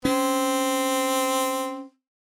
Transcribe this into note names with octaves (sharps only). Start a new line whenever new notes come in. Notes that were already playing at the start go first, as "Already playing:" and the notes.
C4 C#4